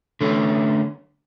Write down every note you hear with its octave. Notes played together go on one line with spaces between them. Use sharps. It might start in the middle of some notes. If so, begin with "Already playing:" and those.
D3 A3 C#4